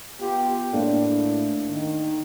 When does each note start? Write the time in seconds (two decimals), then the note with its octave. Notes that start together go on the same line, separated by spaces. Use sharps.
0.20 B3 F4 G4
0.73 A2 A#3 D4
1.71 D#3